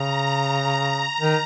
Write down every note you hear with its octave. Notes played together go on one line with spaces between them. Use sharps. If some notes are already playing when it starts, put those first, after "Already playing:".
Already playing: C#3 A#5
D#3